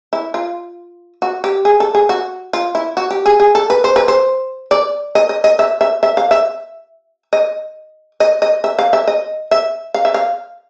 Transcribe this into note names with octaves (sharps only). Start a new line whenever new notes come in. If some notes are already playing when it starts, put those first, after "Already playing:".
E4
F4
F#4
G4
G#4
A4
G#4
F#4
F4
E4
F#4
G4
G#4
G#4
A4
B4
C5
B4
C5
D5
D#5
D#5
D#5
E5
E5
E5
F5
E5
D#5
D#5
D#5
E5
F5
E5
D#5
E5
F5
E5
F5